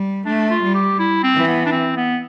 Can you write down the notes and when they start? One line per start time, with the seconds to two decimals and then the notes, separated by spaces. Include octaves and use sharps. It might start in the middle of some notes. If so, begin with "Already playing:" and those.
Already playing: G3
0.25 A3 D4
0.50 F4
0.62 G3
0.74 G4
0.99 E4
1.23 C4
1.35 E3
1.47 B3
1.65 D4
1.72 C4
1.96 B3